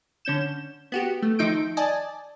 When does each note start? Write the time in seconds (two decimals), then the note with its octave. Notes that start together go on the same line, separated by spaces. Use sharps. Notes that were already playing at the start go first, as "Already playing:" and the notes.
0.25 D3 C#4 G6 E7
0.92 B3 F#4 G4
1.22 A3
1.39 D#3 F3 D#4 E5 G6 D7
1.77 D5 D#5 G#5 A5